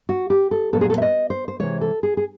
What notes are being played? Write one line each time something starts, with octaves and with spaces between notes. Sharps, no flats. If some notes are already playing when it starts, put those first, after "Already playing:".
F#4
G4
A4
A#2 F#3 B3 A4
G#4
A4
E5
D#5
C5
C5
C3 E3 G#3 C#5
A4
G#4
G#4